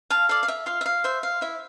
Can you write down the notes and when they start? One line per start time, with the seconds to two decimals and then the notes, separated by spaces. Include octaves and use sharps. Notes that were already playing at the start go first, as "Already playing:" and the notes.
0.10 F5 A5
0.29 A4 D5 F5
0.43 F5
0.48 E5
0.66 F4 F5
0.81 E5
0.86 F5
1.04 C5 E5
1.23 F5
1.41 E4 E5